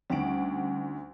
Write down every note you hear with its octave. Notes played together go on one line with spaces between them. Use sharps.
D2 D#3 G3 C#4 F#5 D7